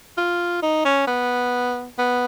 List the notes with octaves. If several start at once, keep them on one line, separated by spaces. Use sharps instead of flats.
F4
D#4
C#4
B3
B3